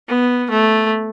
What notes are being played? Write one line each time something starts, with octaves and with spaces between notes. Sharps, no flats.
B3
A3